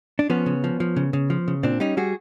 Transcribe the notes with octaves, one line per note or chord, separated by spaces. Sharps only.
D4
F3 B3 C#4
C#3
F3
F3
C#3
C#3
F3
C#3
A#2 C4 D4
G3 C#4 D#4
G3 F#4 G#4